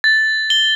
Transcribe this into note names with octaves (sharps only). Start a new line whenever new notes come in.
A6
G7